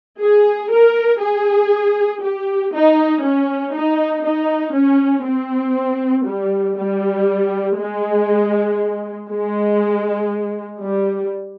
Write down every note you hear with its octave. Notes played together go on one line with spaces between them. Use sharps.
G#4
A#4
G#4
G4
D#4
C#4
D#4
D#4
C#4
C4
G3
G3
G#3
G#3
G3